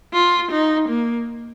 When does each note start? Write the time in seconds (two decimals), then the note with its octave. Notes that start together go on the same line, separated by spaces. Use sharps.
0.13 F4
0.51 D#4
0.89 A#3